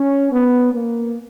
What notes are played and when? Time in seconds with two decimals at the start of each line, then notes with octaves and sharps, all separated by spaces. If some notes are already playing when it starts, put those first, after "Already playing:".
Already playing: C#4
0.32 B3
0.73 A#3